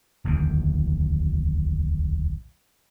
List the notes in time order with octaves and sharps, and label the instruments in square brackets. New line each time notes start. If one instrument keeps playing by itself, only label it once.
[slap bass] D1 A#1 E2 D#3